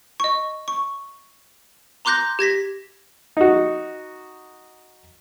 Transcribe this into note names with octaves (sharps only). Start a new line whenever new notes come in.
D#5 C#6
C#6
A#5 C6 D6 F#6 G6 A#6
G4 G#6 A#6 B6
D#4 F#4